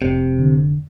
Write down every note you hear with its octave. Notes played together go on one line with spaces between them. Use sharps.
F1 C3
D3